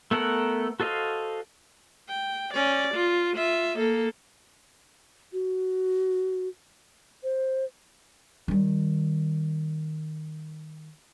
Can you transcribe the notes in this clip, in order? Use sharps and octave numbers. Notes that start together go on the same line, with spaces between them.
A3 B3 A4 A#4 F#5
F#4 A4 C5 D#5 F5
G5
C#4 D5
F4
F4 E5
A#3 A4
F#4
C5
D#3 G3